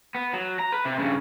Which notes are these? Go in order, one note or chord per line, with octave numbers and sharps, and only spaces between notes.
B3
F#3
A#5
B4
C3
G2 C#3